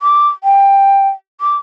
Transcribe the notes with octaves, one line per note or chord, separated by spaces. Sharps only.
D6
G5
D6